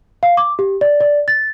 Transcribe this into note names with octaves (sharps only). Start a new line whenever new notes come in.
F5
D6
G4
D5
D5
A6